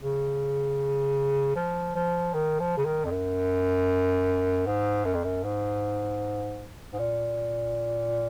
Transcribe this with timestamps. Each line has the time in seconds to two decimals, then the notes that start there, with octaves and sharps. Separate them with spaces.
0.01 C#3
1.56 F3
1.95 F3
2.33 D#3
2.60 F3
2.77 C#3
2.85 D#3
3.05 F2
3.11 F#2
4.66 G#2
5.05 F#2
5.14 F2
5.24 F#2
5.44 G#2
6.93 G#2
6.99 A#2